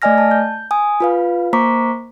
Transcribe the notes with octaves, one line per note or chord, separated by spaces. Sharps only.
A3 D5 D#5 G#5 F6 A#6
A5
G6
G#5 D#6
F4 B4 F5
A#3 C5 A#5 C#6 D6 B6